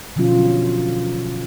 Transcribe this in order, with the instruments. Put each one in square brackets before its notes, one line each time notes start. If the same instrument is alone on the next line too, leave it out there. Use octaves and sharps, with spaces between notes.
[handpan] B2 D3 F3 F#3 C#4 F4